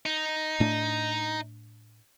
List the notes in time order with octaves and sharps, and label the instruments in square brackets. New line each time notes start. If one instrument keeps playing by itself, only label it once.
[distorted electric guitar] D#4
[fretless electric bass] A2 A3 D4